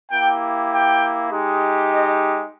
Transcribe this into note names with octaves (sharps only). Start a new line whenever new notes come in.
A#3 E4 G4 G5
G5
G#3 D#4 G4
D#5